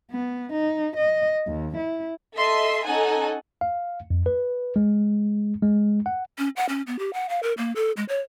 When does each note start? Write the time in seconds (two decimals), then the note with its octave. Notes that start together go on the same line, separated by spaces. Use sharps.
0.12 B3
0.53 D#4
0.97 D#5
1.47 D#2
1.77 E4
2.36 A4 D#5 E5 C6
2.85 C#4 D#4 A4 F#5 G#5
3.61 F5
4.10 F2
4.26 B4
4.76 G#3
5.62 G#3
6.06 F#5
6.38 C#4
6.56 F#5
6.69 C#4
6.87 B3
6.99 G4
7.13 F#5
7.29 F5
7.43 A#4
7.58 A#3
7.76 A4
7.97 G#3
8.09 C#5